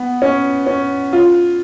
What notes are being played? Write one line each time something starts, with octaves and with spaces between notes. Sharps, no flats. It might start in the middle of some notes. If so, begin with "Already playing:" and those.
Already playing: B3
C#4
C#4
F4